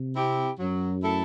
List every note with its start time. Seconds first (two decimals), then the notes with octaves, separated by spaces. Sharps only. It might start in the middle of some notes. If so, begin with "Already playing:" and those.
Already playing: C3
0.15 C4 E4 G4
0.59 F#2 F#3
1.04 A3 E4 A4